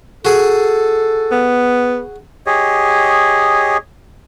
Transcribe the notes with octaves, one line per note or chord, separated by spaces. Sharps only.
F#4 G#4 A4
B3
G4 G#4 C#5 D#5